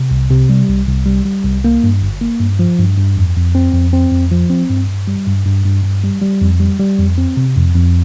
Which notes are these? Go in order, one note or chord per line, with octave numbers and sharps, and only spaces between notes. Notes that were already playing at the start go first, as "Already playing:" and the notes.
Already playing: C3
C2
C3
G3
C2
C2
G3
G3
C2
A#3
G2
G1
A#3
G2
F3
G2
G2
F2
F2
C4
F2
C4
F2
F3
C4
G2
G2
G3
G2
G2
G2
G2
G3
G3
F2
G3
G3
F2
C4
C3
F2
F2